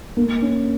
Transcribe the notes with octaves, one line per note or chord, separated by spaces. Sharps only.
A#3
C#4